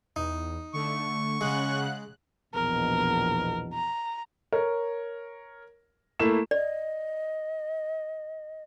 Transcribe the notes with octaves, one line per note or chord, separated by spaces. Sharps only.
E2 D#4
D3 A3 C#6
C#3 G#3 F#5 F#6
A#1 E2 B2 A#4
A#5
A#4 C#5
A3 A#3 E4 E7
D5 D#5